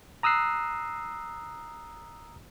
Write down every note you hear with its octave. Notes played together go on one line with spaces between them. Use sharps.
A#5 D#6 E6 F#6 C7